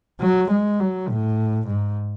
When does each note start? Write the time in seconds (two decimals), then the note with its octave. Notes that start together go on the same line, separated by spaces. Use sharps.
0.21 F#3
0.51 G#3
0.80 F#3
1.09 A2
1.67 G#2